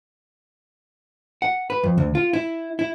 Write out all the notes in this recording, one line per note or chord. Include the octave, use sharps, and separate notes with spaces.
F#5
B4
F2
D2
F4
E4
E4